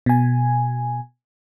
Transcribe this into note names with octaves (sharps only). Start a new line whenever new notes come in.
B2 G#5